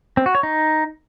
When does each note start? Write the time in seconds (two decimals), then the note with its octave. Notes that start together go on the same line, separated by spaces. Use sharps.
0.17 C4
0.26 F#4
0.35 C#5
0.43 D#4